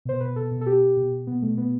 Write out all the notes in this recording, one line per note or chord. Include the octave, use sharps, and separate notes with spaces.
B2 C5
B2 B4
B2 A4
B2
A4
B2 G4
B2
B2
B2
B2 B3
B2 A3
B2 B3